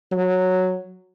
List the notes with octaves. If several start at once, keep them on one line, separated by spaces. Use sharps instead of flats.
F#3